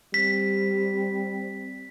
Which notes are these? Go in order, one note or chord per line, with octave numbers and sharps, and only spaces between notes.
G3 C4 B6